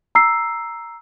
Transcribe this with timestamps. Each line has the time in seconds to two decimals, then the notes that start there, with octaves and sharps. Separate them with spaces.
0.15 A#5 E6 C7